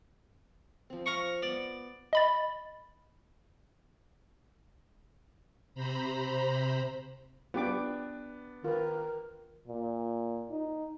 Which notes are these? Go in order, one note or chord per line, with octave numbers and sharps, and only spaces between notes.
F3 C4
F5 A#5 C#6
B3 D5
D#5 B5 A6
C3 C5 A#5 B5
B3 D4 F4 G4 D6
D#3 F4 A#4 B4
A#2
D#4